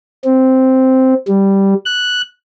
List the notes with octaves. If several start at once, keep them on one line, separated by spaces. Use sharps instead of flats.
C4
G3
F#6